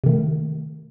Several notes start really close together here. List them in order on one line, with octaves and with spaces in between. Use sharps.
C3 D#3 A3